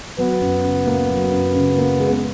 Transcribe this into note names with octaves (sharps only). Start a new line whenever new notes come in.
F#3 B3
F#2
C#3
A#3
F#3
F#2
C#3
A#3
G#3